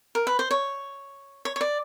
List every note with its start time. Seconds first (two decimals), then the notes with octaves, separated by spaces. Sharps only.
0.15 A#4
0.27 B4
0.39 C5
0.51 C#5
1.45 C#5
1.56 C#5
1.61 D5